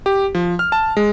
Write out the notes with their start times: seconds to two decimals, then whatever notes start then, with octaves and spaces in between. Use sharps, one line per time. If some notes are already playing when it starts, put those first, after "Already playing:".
0.06 G4
0.35 F3
0.59 F6
0.72 A5
0.97 G#3